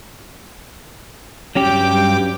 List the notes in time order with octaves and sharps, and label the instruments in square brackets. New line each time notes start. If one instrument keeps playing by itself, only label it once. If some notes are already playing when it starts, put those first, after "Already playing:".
[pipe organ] G2 G5 D6 [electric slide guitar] F#3 C#4 G4